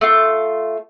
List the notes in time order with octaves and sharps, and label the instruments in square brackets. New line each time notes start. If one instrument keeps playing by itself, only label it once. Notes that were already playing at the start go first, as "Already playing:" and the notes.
[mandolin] A3 F4